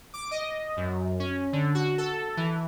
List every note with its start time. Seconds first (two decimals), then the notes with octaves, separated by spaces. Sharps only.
0.14 D6
0.31 D#5
0.77 F#2
1.20 C#4
1.53 D3
1.75 F#4
1.98 A4
2.37 E3